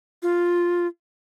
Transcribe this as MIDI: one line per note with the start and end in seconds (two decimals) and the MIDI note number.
0.22 0.87 65